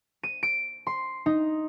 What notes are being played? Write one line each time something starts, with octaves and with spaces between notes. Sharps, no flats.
D#7
D7
C6
D#4